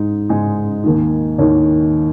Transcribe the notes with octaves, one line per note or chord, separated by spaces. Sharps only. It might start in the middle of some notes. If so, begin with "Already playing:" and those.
Already playing: G#2 G#3 D#4
G#2 G#3 D#4 G#5
D#2 D#3 A#3 D#4
D#2 D#3 A#3 D#4 C#5